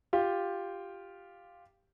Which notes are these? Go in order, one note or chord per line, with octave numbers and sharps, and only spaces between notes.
F4 G4